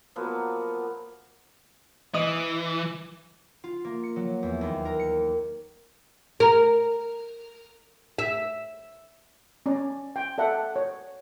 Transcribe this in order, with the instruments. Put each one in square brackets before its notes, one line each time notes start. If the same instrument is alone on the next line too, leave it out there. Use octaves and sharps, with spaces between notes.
[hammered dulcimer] F3 F#3 A#3 B3
[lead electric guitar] E3 [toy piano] D#5 D#6
[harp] F4
A#3
C#7
F#3
E2
D#2
A#4
C#7
[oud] A#4
E5
[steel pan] C#4 D5 A#5
G5
A4 D5 E5 F#5 A#5
C#5